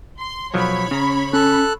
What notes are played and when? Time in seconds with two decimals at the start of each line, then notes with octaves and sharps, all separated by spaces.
0.19 C6
0.54 B1 F3 F#3 C#5 B5
0.91 C#3 C#4 A#5
1.33 C#4 A4 F#6